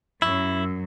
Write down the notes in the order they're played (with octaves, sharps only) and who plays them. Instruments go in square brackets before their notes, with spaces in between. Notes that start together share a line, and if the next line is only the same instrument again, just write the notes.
[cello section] F#2 [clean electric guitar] E4 [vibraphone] C#6 E6